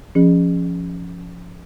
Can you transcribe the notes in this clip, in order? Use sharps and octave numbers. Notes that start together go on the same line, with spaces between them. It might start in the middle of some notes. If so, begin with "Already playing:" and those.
F3 C#4 G#4